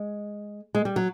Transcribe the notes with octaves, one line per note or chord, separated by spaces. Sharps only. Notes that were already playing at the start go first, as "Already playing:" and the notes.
Already playing: G#3
G#3
G3
F#3